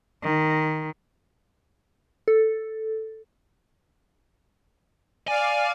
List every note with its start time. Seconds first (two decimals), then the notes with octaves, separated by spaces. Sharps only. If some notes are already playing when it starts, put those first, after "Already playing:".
0.24 D#3
2.28 A4
5.28 D5 F5 G#5